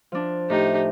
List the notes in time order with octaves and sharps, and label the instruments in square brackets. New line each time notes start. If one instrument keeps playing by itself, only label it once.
[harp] F3 D4
[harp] A2 [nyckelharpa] D#4 G4